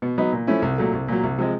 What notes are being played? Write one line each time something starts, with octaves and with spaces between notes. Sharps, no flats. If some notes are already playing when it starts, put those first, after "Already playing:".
B2
F#3 B3 D#4
A#2
F3 A3 C#4 E4
C2
A#2 F#3 A3
C2
A#2 F#3
C2
C3 F3 G#3